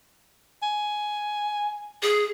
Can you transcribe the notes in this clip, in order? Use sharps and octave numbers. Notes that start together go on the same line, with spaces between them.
G#5
G#4